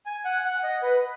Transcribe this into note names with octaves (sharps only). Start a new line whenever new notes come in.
G#5
F#5
F#5
D#5
B4